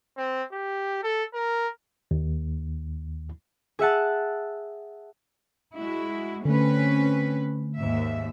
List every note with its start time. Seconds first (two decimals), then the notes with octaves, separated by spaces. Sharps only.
0.17 C4
0.52 G4
1.03 A4
1.34 A#4
2.11 D#2
3.79 G#4 E5 F#5 A5
5.75 G#3 E4 F#4
6.45 D3 A3 C4 C#4 B4
7.77 D#2 G#2 E5